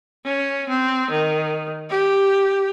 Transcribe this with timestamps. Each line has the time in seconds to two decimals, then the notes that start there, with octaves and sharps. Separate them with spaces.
0.25 C#4
0.69 C4
1.10 D#3
1.90 G4